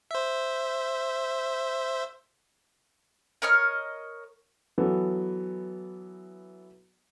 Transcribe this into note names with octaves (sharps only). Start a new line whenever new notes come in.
C5 E5
A#4 C#5 D#5 F6
E3 F#3 B3 A4